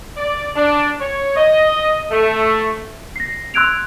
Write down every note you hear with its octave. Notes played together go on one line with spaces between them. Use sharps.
D5
D4
C#5
D#5
A3
A#6 C7
C6 E6 F#6 G#6 D7 F7